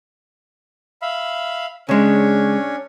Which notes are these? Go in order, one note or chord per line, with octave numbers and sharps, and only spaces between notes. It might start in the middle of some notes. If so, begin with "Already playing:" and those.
E5 F5 B5
C#3 G#3 C#4 D4 C#5